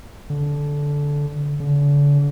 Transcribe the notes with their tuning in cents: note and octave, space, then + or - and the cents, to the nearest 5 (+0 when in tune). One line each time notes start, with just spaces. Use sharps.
D3 -15
D3 -40